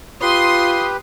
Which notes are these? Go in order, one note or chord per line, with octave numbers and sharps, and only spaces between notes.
F4 G4 B4 C6 D#6